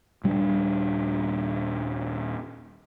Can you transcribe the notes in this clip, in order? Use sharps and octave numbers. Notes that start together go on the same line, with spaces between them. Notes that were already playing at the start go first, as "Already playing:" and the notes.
D#1 G3 C#4 D4